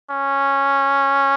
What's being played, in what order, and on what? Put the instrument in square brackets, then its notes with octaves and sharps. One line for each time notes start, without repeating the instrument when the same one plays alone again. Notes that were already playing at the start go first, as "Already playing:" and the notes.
[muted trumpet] C#4